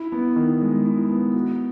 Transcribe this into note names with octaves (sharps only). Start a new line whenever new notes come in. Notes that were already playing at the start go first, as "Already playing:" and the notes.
Already playing: E4
B3
D#3
G#3
E4
B3
F#4